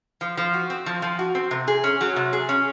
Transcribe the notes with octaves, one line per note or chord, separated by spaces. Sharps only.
F3
F3
F#4
C4
F3
F3
F#4
C4
C3
G#4
C#4
F#3
C3
G#4
C#4